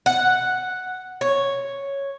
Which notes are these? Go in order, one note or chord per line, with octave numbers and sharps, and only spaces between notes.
F#5
C#5